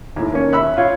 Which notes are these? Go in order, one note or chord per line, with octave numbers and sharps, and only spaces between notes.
D#2 A2
A#3 C#4
E5 B5 E6 F#6
F4 C#5 F5